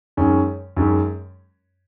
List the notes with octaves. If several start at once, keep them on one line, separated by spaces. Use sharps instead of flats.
F#2 D#3 G#3 C#4
F#2 D#3 G#3 C#4